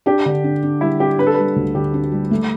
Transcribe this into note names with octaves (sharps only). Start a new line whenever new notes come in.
D4 G4
D3
D4
D4
G3 E4
D4 G4
D4 B4
A4
G3 B4
D2
D3 G4
D4
G3
A3